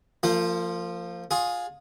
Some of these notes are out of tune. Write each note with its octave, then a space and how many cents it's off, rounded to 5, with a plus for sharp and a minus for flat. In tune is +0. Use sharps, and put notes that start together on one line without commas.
F3 +0 A#3 -40 F4 +0
F4 +25 G#4 +0